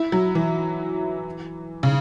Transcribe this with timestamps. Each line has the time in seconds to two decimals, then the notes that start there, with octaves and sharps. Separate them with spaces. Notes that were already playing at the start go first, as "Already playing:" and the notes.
Already playing: E4
0.12 F#3
0.35 E3
1.83 C#3